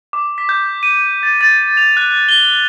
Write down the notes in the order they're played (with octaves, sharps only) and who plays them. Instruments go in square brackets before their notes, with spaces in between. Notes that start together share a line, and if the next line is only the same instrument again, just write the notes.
[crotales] D6
B6
G6
D#7
A6
A6
F7
F#6
G7